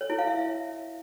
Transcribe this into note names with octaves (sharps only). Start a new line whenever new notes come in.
C#5
E4
F5
E5